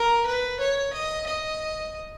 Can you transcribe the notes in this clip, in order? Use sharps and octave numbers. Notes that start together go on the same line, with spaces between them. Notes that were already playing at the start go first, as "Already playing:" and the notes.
Already playing: A#4
B4
C#5
D#5
D#5